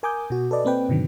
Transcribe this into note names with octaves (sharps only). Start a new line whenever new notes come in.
A#4 G#5 D6 D#6 G6
B2 F#4
A4 B4 D5 D#5
A#3 C4 B4 G5
G2 B2 D3 D#3 F#3